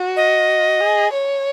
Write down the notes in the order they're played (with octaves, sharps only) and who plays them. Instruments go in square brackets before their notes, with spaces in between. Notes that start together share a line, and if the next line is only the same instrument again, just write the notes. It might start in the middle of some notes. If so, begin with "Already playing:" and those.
Already playing: [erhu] F#4
[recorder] D#5
[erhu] G#4
C#5